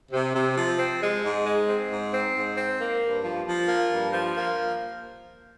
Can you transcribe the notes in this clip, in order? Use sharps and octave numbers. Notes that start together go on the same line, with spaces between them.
C3
C3
F3
C4
G#3
G#2
G#3
C4
G#2
C4
G#2
C4
A#3
G2
F3
F3
A#3
G2
F3
A#3